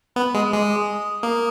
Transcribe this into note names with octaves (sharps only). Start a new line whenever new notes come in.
B3 B5
G#3 D#6
G#3 D6
D#6
A#3 D#6